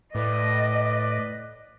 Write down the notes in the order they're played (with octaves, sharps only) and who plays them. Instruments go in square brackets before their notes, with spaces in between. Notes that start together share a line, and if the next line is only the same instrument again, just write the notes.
[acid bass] A2 [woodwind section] B4 D5 [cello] D#5